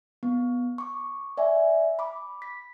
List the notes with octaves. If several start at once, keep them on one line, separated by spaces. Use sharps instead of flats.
B3
C#6 D6
D5 E5 G#5
B5 D6
B6